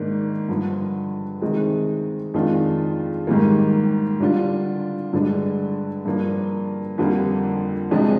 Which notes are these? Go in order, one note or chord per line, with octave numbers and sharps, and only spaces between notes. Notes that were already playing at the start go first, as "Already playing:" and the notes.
Already playing: G#2 D#3 A#3 D4
G2 D3 F3
C3 D#3 G#3 C4
F2 D#3 G#3 D4 F4
G#2 D#3 G3 A#3
D3 G3 D4 F4
G2 D3 G#3 D4
G2 F3 A#3 D4
F2 D3 G3 A#3
F2 C3 F3 G#3 D4